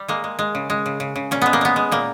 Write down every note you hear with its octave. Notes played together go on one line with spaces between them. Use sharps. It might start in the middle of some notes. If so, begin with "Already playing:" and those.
Already playing: G3
G#3 A#3
G#3
G#3
C#3
G#3
C#3
C#3
C#3
A#2 C#4
G#3 B3
A#3
G#3 B3
G#3
A#2 A#3